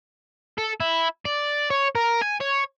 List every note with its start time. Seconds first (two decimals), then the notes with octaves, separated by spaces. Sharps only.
0.58 A4
0.80 E4
1.25 D5
1.70 C#5
1.95 A#4
2.22 G#5
2.41 C#5